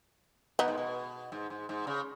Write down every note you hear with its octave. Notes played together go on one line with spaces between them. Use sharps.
B2 B3 D#4
G#2
B2
G#2
G#2
G#2
C#3